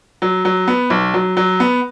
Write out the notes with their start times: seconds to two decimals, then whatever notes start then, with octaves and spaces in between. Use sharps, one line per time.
0.22 F#3
0.45 F#3
0.68 B3
0.90 B1
1.14 F#3
1.37 F#3
1.60 B3